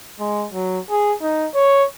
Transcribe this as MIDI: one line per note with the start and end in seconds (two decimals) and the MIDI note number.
0.20 0.47 56
0.52 0.79 54
0.90 1.14 68
1.22 1.48 63
1.55 1.85 73